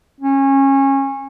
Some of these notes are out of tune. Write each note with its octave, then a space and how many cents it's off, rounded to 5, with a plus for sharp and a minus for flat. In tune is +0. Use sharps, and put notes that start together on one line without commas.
C#4 -25